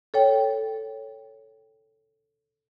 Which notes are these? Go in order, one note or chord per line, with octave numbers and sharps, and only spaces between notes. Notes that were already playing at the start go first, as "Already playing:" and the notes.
A4 C#5 G5